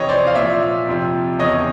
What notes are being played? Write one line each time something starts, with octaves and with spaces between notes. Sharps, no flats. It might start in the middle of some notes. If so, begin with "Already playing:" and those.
Already playing: F2 C3 E3 C#5 D#5
C5 D5
F5
A#2 F3 D5 E5
F2 C3 F3
E2 C#3 E3 C#5 D#5